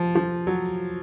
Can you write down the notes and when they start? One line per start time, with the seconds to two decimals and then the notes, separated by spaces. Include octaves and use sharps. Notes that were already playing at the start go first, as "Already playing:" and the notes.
Already playing: F3
0.15 F3
0.47 F#3